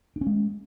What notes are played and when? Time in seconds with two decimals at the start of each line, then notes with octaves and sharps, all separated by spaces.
0.16 D4
0.21 C#4
0.27 G#3